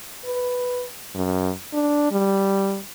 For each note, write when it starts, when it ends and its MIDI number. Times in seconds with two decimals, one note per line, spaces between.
0.25 0.84 71
1.15 1.51 42
1.73 2.09 62
2.11 2.79 55